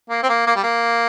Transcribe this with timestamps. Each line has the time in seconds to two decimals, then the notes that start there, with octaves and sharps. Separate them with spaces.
0.10 A#3
0.23 C4
0.29 A#3
0.47 A#3
0.55 G3
0.64 A#3